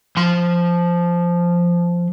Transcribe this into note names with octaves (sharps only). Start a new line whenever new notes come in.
F3 C6